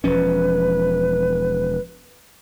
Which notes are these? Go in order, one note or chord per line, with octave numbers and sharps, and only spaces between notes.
E1 F3 C#4 B4